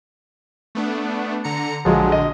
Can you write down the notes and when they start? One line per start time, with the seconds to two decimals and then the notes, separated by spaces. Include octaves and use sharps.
0.75 A3 B3 D4
1.44 D3 A#5 C#7
1.85 A#1 D3 F3 F#3 G#3
2.12 D#5